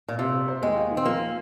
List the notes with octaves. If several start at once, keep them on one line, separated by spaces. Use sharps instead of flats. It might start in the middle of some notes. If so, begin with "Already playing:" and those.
A#2
C3 F4
C4
C5
D#2 G#3
F4
D#3
C4
F3 A#3